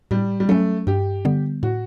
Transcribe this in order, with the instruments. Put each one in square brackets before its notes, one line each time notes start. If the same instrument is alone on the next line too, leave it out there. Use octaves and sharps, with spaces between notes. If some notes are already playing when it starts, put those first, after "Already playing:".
[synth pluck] A2 [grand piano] G3
[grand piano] G3
[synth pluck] F#3 C#4 [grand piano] A3
[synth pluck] G2 [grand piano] G4
[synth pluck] D3 G3 B3
[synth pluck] A2 [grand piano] F#4